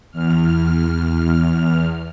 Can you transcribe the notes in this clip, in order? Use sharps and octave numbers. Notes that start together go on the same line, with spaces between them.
E2 F6